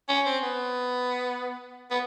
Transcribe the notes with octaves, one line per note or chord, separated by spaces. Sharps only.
C#4
C4
B3
B3